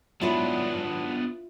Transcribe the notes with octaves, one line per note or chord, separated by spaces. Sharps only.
G#2 F#3 B3 D4 E4 F4 B4